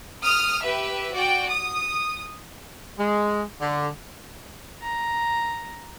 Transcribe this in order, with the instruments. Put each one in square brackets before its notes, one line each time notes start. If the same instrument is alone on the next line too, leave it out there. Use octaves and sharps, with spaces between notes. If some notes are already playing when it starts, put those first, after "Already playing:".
[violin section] D#6 F6
G4 B4 E5
F#4 D5 G5
D#6
[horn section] G#3
D3
[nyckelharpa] A#5